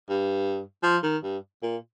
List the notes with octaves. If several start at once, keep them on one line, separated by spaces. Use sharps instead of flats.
G2
F3
D#3
G2
A#2